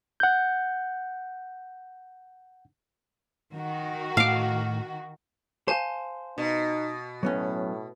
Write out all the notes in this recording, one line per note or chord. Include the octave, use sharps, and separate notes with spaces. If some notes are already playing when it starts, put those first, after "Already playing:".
F#5 G6
D#3 F#4
A2 F5 D6
C5 F5 G#5 A5
B2 D#4
A2 F#3 B3 C#4